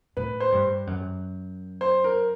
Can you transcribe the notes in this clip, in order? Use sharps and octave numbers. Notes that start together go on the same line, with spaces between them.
A2 B4
C5
G2
F#2
C5
A#4